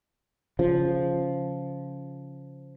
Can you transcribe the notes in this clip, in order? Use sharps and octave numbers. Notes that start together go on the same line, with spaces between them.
C#3 F3